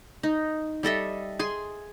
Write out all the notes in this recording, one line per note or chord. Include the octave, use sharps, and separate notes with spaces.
D#4
G3 A4 D#5 E5
G#4 G#5 C6